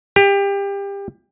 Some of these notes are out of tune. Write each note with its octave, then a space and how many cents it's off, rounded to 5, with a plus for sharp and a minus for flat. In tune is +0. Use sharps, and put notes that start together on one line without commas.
G4 +25